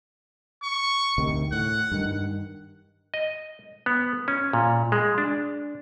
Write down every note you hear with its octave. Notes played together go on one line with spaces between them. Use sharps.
C#6
D2 C3 D#3
A2 F#5
G2 D#3
D#5
B3
C#4
A#2
G#3
D4